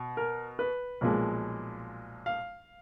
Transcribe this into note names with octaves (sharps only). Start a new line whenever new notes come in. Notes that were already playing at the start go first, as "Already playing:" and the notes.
Already playing: B2
A#4
B4
B1 A#2 F3 G#3
F5